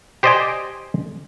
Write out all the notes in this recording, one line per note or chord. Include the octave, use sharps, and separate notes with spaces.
G4 C5 D5 D#5 G5 G#5